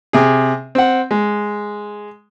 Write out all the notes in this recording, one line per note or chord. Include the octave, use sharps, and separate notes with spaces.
C3 G#4
C4 F#5
G#3